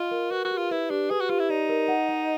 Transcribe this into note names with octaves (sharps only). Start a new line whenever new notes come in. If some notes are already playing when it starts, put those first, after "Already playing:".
Already playing: F4 D#5
A#4
F#4 B4
F#4
G4
F4
E4 B4
D4 G4
G#4 B4
F#4
F4 G4
E4
D#4 D5
A#4
F#5
D#5